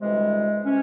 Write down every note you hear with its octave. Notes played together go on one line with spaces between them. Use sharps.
D2 C3 E3 G3 G#3
C3 C#4